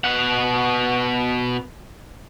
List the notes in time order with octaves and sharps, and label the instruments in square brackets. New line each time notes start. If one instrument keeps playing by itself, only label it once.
[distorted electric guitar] B2 F#5